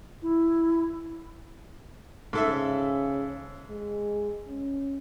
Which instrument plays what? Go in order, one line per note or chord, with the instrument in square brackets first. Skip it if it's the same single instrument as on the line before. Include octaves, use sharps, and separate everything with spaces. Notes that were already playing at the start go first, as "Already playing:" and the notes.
[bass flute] E4
[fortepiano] G#2 A4 E5 [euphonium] C#3
[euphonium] G#3
C#4